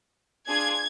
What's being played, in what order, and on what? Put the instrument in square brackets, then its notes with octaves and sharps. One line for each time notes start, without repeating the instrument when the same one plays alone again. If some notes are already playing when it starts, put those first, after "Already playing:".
[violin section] D4 F4 G#4 G#6